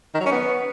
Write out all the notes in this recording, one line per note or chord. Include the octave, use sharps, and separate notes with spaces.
D#3
F#3
C#4
B3